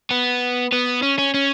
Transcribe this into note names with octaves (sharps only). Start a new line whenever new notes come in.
B3
B3
C#4
C#4
C#4